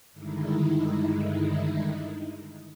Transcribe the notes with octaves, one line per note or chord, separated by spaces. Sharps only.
G2 D3 D#3 G#3 D#4 E4